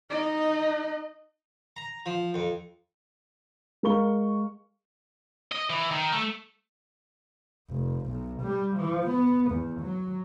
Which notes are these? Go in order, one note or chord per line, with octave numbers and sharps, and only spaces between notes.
D#4 D#5
A#5
F3
F2
G#3 A#4 F5 C#6 G7
D#5
E3
D#3
A3
F1
B1
G3
F3
B3
E2
F#3